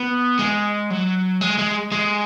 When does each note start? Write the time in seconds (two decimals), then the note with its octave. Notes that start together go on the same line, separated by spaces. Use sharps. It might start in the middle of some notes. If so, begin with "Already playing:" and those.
Already playing: B3
0.39 G#3
0.90 F#3
1.41 G#3
1.58 G#3
1.92 G#3